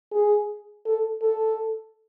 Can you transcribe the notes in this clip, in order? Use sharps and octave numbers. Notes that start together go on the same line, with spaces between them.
G#4
A4
A4